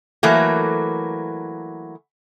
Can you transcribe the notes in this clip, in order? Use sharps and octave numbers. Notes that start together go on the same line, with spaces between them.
E3 F#3 A3 A#3